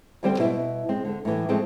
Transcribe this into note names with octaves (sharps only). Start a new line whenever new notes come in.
D2 D3 G3 C4 C5 G5
B2 E4
G#3 C4
D3
A2 E3
F3 G#3 A3 C4